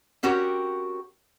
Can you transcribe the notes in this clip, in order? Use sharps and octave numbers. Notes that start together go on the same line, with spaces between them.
C4 C#4 F#4 G4 A#4